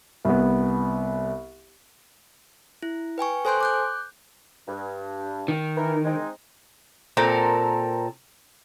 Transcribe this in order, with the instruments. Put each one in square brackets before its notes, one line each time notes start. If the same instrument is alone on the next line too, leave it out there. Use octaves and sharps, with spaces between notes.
[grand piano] C2 B3
[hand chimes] E4
B4 G5 G#5 C#6
A4 C5 G#5 C6 F#6 G6
D6 F#6 G6
[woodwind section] G2
[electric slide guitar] D#3
[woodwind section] E3 A#4
G#3 C4 D#4
[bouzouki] A#2 C4 A4 A#4